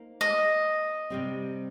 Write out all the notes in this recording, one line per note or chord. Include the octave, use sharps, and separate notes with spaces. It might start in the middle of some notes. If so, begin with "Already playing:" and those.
Already playing: A#3 D#4 C5
D#5
C3 G3 C4